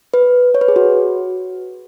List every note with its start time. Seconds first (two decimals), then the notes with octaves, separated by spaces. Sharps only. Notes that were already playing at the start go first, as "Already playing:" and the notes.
0.14 B4
0.55 C#5
0.61 B4
0.68 G#4
0.76 F#4